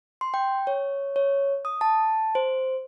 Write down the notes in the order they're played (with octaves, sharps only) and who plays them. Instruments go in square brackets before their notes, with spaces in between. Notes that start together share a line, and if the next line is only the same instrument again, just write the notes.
[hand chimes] C6
G5
C#5
C#5
D#6
A5
C5